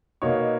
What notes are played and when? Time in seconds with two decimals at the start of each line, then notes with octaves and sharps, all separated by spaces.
0.22 B2 A#3 D#4 F#4 C#5